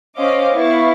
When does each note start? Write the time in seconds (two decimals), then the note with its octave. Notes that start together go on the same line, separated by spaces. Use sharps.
0.17 C#4 C5 C#5 D#5 F5 D6
0.54 B3 E4 F5 C#6 A6